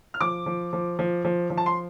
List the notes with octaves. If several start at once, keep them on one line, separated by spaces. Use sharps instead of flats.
F6
F3 D6
F3
F3
F3
F3
F3
A5
C6